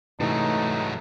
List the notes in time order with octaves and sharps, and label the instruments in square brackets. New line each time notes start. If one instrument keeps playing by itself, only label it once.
[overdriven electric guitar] G#2 F#3 [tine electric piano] C3 E3 [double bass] A3 [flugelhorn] D#4